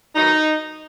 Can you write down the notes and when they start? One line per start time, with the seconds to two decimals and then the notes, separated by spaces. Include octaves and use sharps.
0.16 D#3 F#3 B3 D#4